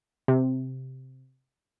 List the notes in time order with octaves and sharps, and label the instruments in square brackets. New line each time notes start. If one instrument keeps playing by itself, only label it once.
[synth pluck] C3